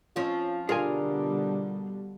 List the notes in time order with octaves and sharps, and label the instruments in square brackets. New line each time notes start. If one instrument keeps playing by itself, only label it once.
[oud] F3 C4 C#4 [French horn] F4
[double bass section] B2 D3 G3 [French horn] D4 [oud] F4 [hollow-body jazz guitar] G#4 A#4 G#5